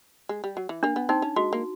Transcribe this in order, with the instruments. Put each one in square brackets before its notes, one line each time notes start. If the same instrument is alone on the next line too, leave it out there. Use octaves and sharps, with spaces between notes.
[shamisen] G#3
G3
F#3
E3
[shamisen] A#3 [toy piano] D4
[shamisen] B3
[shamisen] C4 [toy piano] D#4
[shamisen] C#4
[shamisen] G#3 [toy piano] F#4
[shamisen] A#3